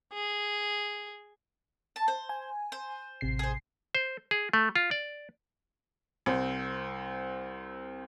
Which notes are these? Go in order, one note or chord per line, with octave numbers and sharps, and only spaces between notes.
G#4
A5
C5
G#5
C5
A1 C3 C7
G#4 C5
C5
G#4
A3
F4
D5
C2 C4